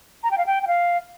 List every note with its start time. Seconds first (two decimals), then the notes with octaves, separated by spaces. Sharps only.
0.23 A#5
0.31 G5
0.38 F5
0.46 G5
0.63 G5
0.67 F5